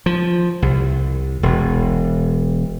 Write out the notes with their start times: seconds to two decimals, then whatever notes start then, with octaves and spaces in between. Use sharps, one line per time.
0.06 F3
0.62 C2
1.43 E1